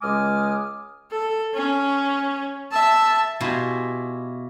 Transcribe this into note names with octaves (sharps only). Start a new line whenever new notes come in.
C#2 G#3 G#5 D6 D#6 F6
A4
C#4
E5 A5
B2 E4 F4 G4 G#4